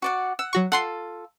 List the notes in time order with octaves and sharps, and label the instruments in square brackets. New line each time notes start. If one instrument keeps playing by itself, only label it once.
[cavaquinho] F#4 D5 F#5
[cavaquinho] F#5 [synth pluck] E6
[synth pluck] F#3 F#4 C#6
[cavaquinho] F4 A4 [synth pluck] F#5 C6 C7